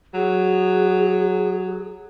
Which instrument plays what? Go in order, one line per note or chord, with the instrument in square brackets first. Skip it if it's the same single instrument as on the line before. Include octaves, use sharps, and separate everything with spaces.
[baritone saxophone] F#3 [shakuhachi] G#4